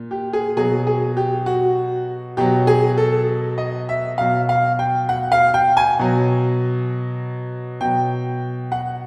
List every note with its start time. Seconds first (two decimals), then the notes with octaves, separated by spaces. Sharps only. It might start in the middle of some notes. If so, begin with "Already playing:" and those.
Already playing: A#2
0.11 G4
0.33 G#4
0.57 B2 F#3 G#4
0.87 G#4
1.17 G4
1.46 F#4
2.37 B2 F#3 G4
2.67 G#4
2.98 A4
3.58 D#5
3.89 E5
4.18 B2 F#3 F5
4.49 F5
4.79 G5
5.09 F#5
5.32 F5
5.54 G5
5.77 G#5
5.99 B2 F#3
7.81 B2 F#3 G5
8.72 F#5